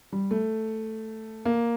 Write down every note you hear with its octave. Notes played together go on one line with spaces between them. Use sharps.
G3
A3
A#3